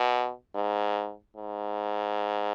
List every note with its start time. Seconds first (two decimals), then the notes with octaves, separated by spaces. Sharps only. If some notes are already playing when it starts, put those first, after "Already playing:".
Already playing: B2
0.55 G#2
1.37 G#2